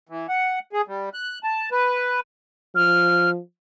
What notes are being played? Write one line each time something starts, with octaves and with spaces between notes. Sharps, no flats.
E3
F#5
G#4
G3
F#6
A5
B4
F3 F6